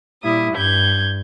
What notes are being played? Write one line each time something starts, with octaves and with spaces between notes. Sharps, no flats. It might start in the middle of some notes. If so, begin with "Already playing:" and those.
A#2 G3 E4 D#6
G2 G6 G#6